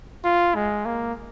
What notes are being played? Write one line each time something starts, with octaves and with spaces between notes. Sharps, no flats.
F4
G#3
A#3